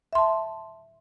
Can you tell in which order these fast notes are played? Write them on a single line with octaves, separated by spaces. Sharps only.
E5 C6 A5